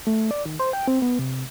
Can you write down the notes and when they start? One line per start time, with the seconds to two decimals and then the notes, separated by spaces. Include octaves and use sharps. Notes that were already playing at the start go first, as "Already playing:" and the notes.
0.07 A3
0.31 D5
0.46 D#3
0.59 C5
0.73 G5
0.88 C4
1.02 B3
1.19 C3